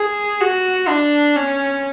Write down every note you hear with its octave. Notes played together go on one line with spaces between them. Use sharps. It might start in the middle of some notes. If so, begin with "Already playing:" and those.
Already playing: G#4
F#4
D4
C#4